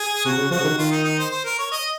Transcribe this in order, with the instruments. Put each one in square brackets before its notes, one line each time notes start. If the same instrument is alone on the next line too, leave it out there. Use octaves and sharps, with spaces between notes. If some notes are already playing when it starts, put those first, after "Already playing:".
Already playing: [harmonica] G#4
[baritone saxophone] C3 [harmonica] F#4
[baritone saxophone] C#3
[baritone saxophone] F3 [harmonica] F#4
[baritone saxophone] C#3
D#3
[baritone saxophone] D#3 [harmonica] F4
[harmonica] D#4
D#4
C5
C5
A#4
C#5
D#5